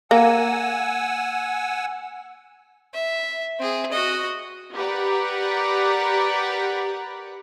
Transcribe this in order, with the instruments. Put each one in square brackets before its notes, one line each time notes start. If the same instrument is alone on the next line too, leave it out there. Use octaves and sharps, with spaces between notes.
[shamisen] A#3 [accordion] F#5 G#5 E6
[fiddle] E5
C4 G#4
F#4 D#5
[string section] G4 A#4 B4 D5 F#5